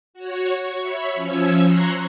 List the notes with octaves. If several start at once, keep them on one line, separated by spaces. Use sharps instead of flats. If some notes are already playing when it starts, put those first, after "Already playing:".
F#4 C#5
C#6
C#5 E5 B5
F3 C#4 E6 G#6
A#5 C6 C#6 F#6 C7